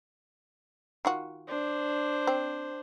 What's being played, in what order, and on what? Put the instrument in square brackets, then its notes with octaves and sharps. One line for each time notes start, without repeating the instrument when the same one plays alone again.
[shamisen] D#3 F4 F#4
[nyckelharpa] D4 C5
[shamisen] C4